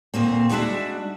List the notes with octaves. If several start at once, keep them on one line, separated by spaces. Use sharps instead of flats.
D2 A#2 A#3 C4
G3 G#3 D4 E4 F#4 E5